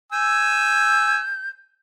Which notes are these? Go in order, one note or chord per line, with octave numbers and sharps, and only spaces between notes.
G#5 E6 G6